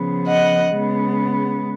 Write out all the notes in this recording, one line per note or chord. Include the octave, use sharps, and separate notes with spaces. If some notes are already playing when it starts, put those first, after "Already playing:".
Already playing: C#3 F3 B3
D#5 F#5
C#3 G#3 B3